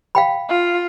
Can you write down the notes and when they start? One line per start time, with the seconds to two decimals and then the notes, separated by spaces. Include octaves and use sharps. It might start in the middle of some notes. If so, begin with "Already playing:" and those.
0.15 F5 G5 B5
0.49 F4